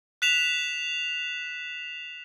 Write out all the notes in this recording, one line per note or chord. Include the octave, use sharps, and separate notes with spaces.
F#6 B6 E7 F7